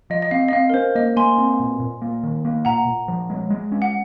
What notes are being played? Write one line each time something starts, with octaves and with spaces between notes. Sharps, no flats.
F3 D#5
D#5
C4 F5
D#5
C4 F5
A#4
C#4 C5
A#3 D#5
A#3 G#5 C6
C4
A#2
A#2
A#3
D#3
A#3
A#2 F#5 A#5
A#2
F3
G#3
G#3
C#4
F#5